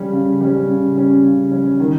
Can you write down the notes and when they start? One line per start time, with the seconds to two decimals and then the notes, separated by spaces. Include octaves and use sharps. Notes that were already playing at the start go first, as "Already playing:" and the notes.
Already playing: C#3 G3 C#4
0.13 C#3
0.41 G3 C#4
0.68 C#3
0.95 G3 C#4
1.24 C#3
1.51 G3 C#4
1.80 D#3